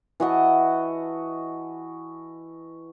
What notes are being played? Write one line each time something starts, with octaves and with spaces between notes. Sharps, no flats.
E3 F#4 D#5 A5